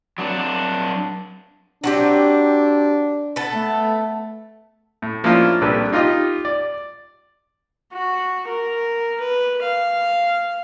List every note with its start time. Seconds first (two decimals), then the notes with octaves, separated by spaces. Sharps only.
0.18 F#3 D4
1.84 F#3 C4 D4 G4
3.36 B3 A4
3.54 A3
5.02 A2
5.24 F3 A#3 C#4 D4 E4 F4
5.61 C2 A#3 D4 G4 A4 B4
5.92 D#4 F4 G4 D#5
6.45 D5
7.93 F#4
8.48 A#4
9.20 B4
9.62 F5